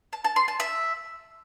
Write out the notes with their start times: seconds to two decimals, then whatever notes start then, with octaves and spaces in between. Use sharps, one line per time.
0.13 A5
0.24 A5
0.36 C6
0.48 A5
0.60 E5